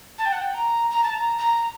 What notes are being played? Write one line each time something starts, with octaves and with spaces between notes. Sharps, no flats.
A5
G5
F#5
G5
A#5
A#5
A5
A#5
A#5